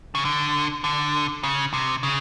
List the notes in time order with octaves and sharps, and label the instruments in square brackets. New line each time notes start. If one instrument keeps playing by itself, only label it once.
[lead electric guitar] C#3
D3
D3
C#3
C3
C#3